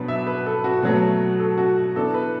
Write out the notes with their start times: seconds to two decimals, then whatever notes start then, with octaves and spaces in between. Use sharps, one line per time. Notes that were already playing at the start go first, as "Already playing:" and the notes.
Already playing: B2 F#3 B3 D4 B5
0.08 E5
0.27 B4
0.46 A4
0.64 F#4
0.82 B2 F#3 A3 F#4
1.39 A4
1.58 F#4
1.96 E3 B3 D4 A4
2.14 B4